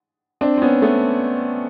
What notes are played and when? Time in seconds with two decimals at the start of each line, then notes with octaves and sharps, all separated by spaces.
0.41 C4 D4
0.57 C4
0.62 B3 C#4
0.82 A3 B3